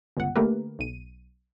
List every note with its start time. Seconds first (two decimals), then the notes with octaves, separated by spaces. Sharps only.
0.17 G1 C#2 F#5
0.36 D3 A3 A#3 G4 A#4 B4
0.79 B1 D#7